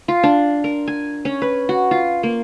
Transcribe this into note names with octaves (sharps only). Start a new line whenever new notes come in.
F4
D4
A#4
G#5
C#4
B4
F#4
F4
A#3